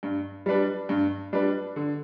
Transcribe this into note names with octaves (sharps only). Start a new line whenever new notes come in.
G2
G3 D4 B4
G2
G3 D4 B4
D3